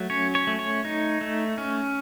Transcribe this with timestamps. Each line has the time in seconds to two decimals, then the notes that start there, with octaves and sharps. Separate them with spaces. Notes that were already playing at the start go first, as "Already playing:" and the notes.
Already playing: F#3 A3
0.10 C#4 C#5
0.35 C#5
0.47 A3
0.59 C#5
0.85 D#4
1.21 A3
1.58 C#4